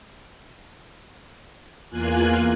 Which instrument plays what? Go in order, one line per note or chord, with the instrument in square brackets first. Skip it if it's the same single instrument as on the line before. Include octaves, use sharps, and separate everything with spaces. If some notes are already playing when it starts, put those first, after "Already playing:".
[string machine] E2 A#3 F4 G#5 F#6